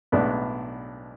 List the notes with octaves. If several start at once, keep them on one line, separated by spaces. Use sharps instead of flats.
B1 A2 G#3 B3 D4